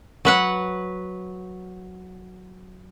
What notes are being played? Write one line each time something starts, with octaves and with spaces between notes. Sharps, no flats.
F#3 B4 F#5